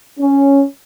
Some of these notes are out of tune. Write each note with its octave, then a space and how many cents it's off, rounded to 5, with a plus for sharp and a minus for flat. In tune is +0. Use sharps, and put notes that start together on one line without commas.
C#4 +0